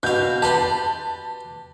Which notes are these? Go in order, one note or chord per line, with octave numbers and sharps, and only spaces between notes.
B2 F5 G6
G4 B4 A5 C6